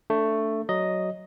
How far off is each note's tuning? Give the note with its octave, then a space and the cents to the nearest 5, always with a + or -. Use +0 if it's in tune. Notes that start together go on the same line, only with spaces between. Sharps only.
A3 +10 D4 -20
F#3 +10 D#5 +0